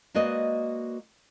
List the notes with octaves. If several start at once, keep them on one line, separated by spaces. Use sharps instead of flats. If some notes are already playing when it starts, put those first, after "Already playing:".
G#3 A#3 F#4 B4 D5 D#5